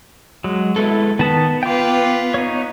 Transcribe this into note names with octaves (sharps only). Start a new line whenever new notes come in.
F#3 G#3
G#3 B3 E4 A4
D#3 B3 A5 D#6
F4 B4 G5 D6
D#4 C#5